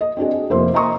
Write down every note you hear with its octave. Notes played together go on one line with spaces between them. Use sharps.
D#5
C4 D4 F#4 G#4
D#5
F1 A#3 E4 C5 E5 C6
D#5 E5 A#5 C6 C#6 D#6